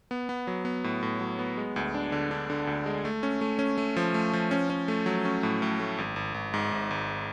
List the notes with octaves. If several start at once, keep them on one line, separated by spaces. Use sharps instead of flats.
B3
B3
F#3
B3
A2
A2
F#3
B3
G#3
D2
D4
D3
D4
D3
D2
G#3
A3
C#4
A3
C#4
A3
F3
A3
F3
C#4
C#4
A3
F#3
C#4
A2
A2
A3
G#1
G#1
G#1
G#2
G#1
G#1